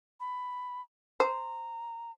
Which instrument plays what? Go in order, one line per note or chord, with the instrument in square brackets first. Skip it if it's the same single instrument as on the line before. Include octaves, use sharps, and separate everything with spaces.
[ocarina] B5
[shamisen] C5 [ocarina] A#5